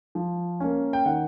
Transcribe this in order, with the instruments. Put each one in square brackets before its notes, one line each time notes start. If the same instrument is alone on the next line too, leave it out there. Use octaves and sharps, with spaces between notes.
[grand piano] F3
A#3 C#4
G5
D#3 F#5